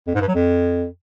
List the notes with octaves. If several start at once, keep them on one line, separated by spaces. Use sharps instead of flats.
F2
G#2
G2
F#3
F2